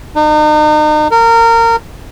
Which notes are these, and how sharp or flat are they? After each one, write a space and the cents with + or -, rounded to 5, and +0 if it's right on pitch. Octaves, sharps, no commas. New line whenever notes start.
D#4 -40
A#4 -25